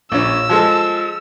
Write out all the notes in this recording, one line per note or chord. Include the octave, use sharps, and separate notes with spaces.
A#1 C#4 E6
F3 G#3 A4